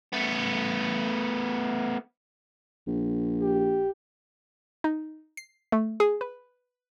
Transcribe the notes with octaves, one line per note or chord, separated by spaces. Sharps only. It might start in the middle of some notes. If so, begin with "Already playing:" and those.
A3 B3
A#1
G4
D#4
C7
A3
G#4
B4